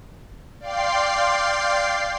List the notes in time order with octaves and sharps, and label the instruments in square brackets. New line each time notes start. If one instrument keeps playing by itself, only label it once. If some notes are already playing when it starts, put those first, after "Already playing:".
[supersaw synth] D5 F5 G5 C6 C7